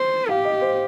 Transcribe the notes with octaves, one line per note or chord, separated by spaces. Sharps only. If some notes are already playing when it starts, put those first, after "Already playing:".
Already playing: C5
G4 F5
D#5
C5